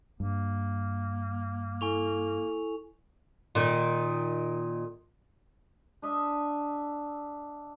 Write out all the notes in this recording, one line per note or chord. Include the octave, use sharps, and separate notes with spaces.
G2 A#3
E4 A4 G#5 C#6 F7
A#2 D#3
D4 D#5 E5